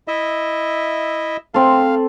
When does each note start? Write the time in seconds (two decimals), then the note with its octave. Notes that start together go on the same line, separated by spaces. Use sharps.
0.08 E4 D#5 E5
1.54 C4 A4 F5